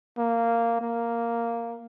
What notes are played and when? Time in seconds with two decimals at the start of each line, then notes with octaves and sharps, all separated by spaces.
0.18 A#3
0.81 A#3